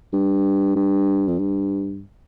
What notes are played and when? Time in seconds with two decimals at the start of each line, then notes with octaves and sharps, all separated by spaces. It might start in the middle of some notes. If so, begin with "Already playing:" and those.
0.13 G2
0.76 G2
1.28 F2
1.39 G2